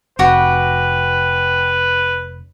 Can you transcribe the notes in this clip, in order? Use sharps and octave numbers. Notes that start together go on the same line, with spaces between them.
F1 F#4 G4 B4